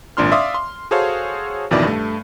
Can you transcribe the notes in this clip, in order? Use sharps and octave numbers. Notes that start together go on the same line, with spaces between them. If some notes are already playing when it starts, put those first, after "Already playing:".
G#1 A#2 D4 C6 F6
D5 E5 F5 C6 D6 D#6
C6
F#4 G#4 A4 C5 C#5 F5
A1 F2 B2 D#3 E4 D5
G2 A3